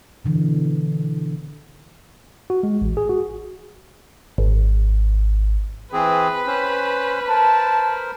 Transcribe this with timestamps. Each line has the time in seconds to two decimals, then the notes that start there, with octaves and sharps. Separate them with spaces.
0.24 B2 D3 E3
2.50 F#4
2.63 G#3
2.82 A1
2.97 G#4
3.09 F#4
4.38 G#1
5.93 E3 C4 G#4 B4
6.47 C#4 C5
7.29 A#4 C5 A5